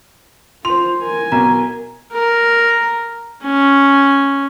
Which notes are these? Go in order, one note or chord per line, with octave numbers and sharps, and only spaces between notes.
F4 C5 C6 F7
A#4 G#5
B1 A#5
A#4
C#4